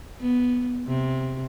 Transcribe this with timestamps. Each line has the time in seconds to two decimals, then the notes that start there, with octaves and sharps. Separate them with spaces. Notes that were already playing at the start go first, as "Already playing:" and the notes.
0.20 B3
0.88 C3